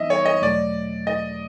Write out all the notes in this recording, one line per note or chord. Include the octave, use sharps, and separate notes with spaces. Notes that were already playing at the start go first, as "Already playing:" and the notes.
Already playing: E3 G3 B3 D#4 D#5 E5
C#5
D#5
E2 B2 F#3 A3 D5
D#5